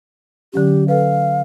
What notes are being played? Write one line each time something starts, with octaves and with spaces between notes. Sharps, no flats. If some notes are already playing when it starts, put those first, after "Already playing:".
D3 F#3 C#4 G4
A4 B4 F5